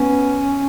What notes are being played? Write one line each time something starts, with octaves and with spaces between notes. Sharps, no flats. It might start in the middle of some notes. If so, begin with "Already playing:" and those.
Already playing: B3 C#4